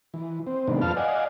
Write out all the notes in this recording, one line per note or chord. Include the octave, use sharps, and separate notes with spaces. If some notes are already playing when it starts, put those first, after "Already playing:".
E3
C4
G#2 C3 D#3 A#3 B3 D4
F2 B4 F5 A5 F6
D5 D#5 F5 F#5 G#5